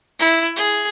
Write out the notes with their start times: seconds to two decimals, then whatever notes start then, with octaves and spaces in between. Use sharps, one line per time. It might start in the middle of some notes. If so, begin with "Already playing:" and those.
0.19 E4
0.56 G#4